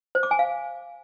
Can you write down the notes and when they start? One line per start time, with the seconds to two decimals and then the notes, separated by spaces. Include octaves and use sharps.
0.15 C5
0.23 D6
0.31 G#5
0.39 F5